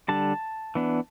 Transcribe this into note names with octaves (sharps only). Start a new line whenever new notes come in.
D3 G3 D4 A5
E3 B3 D4